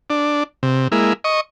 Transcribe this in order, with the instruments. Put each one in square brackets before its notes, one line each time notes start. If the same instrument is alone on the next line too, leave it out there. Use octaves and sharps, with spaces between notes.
[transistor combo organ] D4
C3
G#3 A#3 E4
D#5 C#6